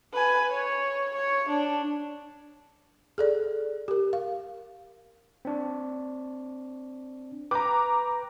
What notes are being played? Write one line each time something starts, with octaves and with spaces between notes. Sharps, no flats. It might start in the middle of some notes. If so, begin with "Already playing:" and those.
B4 G#5
C#5
C#5
D4
G#4 A4 D5
G4 A#4
F5
C4 D4
B4 G5 A#5 D6